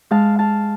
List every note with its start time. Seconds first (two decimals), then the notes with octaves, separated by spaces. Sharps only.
0.11 G#3 F5 A5
0.39 F5 A5